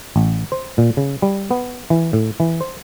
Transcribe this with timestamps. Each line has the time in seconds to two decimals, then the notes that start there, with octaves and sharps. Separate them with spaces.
0.16 A1
0.52 C5
0.78 A#2
0.97 C#3
1.22 G3
1.51 B3
1.90 E3
2.13 A2
2.40 E3
2.61 C5